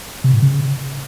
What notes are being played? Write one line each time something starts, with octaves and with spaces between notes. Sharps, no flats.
C3
A2
C#3